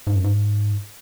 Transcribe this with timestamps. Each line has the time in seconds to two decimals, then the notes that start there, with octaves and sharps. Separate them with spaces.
0.07 G#2
0.16 F#2
0.24 G#2